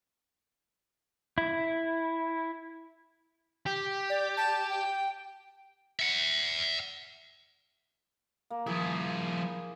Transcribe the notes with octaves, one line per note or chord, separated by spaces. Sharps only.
E4
G4
D5
A5
G5
E5 F#5
A#3
F3 E4 G#4